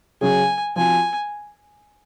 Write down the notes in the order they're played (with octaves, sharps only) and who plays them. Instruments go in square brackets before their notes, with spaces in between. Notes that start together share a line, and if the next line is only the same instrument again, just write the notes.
[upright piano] C#3 F#3 C#4 G#4 [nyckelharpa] G#5
[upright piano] F3 C4 F#4 [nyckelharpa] G#5